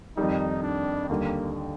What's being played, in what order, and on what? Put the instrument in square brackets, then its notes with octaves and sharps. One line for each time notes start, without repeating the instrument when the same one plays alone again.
[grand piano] F2 D#3 G3 [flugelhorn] D#4
[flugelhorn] D4
[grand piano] D#2 D3 G3 [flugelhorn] A#3